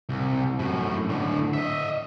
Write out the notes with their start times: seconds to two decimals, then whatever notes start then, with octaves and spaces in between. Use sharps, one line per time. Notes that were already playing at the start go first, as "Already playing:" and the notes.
0.09 C2
0.59 F#2 A2
1.09 A2 D3
1.53 D#5 E5